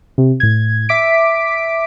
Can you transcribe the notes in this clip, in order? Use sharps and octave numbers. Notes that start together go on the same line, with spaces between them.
C3
A2 G#6
E5 D6 B6 D7